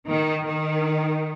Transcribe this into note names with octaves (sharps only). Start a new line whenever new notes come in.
D#3
D#3